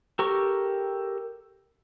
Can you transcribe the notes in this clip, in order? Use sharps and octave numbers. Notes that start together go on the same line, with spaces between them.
G4 A4 A#4 C#6